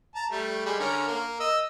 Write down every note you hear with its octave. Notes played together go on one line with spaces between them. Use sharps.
A5 A#5
G3 A3
G3 G#3
D3 C#4 A#4
A#3
D#5 E6